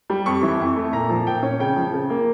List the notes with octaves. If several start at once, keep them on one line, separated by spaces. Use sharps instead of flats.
G3
F2 C#6
E3
F2
A3
A#2 A#5
F3
A#2 G5
C#4
C#3 G5
F3
C#3
A#3